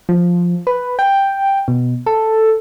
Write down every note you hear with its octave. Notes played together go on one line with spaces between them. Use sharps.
F3
B4
G5
B2
A4